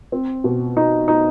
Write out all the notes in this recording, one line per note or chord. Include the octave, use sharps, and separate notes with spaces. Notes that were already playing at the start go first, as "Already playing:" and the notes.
C4
B2
D#4
D#4